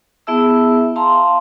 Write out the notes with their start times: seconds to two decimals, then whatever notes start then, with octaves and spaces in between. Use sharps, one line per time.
0.27 B3 E4 G#4 E5 A5 E6
0.96 F5 A5 A#5 C6